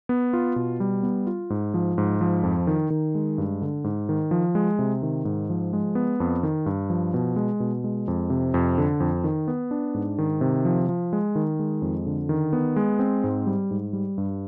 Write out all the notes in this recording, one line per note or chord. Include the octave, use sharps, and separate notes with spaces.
B3
F4
B2
G3
B3
F4
G#2
F3
G#2
F3
F2
D#3
D#3
G#3
G2
D3
G#2
D#3
F3
G#3
C3
D#3
G#2
F3
G#3
B3
F2
D#3
G2
F3
B2
G#3
B2
G#3
F2
C3
F2
D3
F2
D#3
B3
D4
G#2
D#3
C3
F3
F3
G#3
D#3
G#3
F2
D3
D#3
B3
G#3
C4
G#2
G3
G#2
G3
G2